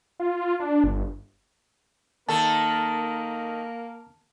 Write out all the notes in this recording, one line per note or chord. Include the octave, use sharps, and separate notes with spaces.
F4
D4
G1
D#3 A#3 A4 A#4 A5